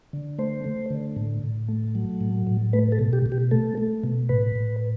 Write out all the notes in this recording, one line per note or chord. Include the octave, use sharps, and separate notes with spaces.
D3
A3 C5
A3
D3
A2
A2
A3
F#3
A2
A2
A3 B4
A4
B2
G4
B2
G4
A3 A4
A3
B2
A2 B4
A2